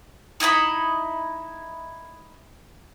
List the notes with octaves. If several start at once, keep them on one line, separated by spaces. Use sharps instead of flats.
D#4 E4 D#5 B5